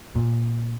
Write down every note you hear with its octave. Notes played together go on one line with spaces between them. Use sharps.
A#2